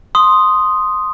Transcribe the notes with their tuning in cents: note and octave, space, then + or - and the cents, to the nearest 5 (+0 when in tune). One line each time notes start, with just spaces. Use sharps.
C6 +0 D#6 +0